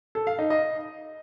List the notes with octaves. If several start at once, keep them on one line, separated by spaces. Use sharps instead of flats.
A4
F5
D#4
D#5